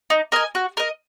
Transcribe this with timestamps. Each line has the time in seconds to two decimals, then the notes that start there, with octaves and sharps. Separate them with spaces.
0.10 D#4
0.32 A#4 D#5 G#5
0.55 F#4
0.77 A#4 D#5